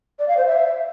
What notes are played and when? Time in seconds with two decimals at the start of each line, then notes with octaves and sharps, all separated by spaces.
0.19 D5
0.28 F5
0.37 C5
0.46 E5